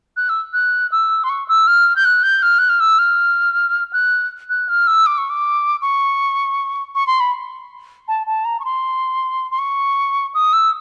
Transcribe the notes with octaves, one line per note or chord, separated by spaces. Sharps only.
F#6
E6
F#6
E6
C6
C#6
E6
F6
G6
F#6
G6
F6
F#6
F6
E6
F6
F#6
F#6
F6
E6
D6
C#6
D6
C#6
C#6
C6
B5
A5
A5
A#5
C#6
C6
C6
C#6
D#6
E6